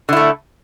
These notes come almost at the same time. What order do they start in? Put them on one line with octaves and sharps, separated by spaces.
D3 E4 A3